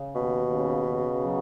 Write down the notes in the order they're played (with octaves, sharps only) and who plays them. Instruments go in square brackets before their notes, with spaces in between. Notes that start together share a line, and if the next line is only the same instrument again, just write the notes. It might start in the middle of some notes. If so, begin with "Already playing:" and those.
Already playing: [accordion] C#3
[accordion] D#2 [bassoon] B2
[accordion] C#3
C#3
F#3